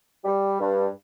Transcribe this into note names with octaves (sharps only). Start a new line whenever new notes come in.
G3
G2